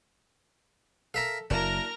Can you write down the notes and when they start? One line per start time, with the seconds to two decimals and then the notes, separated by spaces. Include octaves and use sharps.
1.14 A4 A#4 E5 F5
1.50 F#1 F#3 A#3 D4 E4 A#4 A#5 F6